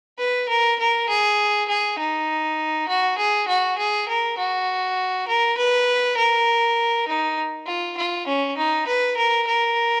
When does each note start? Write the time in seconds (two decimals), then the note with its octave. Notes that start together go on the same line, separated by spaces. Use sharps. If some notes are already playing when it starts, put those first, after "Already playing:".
0.19 B4
0.49 A#4
0.79 A#4
1.09 G#4
1.69 G#4
1.98 D#4
2.89 F#4
3.18 G#4
3.48 F#4
3.78 G#4
4.08 A#4
4.38 F#4
5.28 A#4
5.57 B4
6.17 A#4
7.08 D#4
7.67 F4
7.97 F4
8.27 C#4
8.57 D#4
8.87 B4
9.17 A#4
9.47 A#4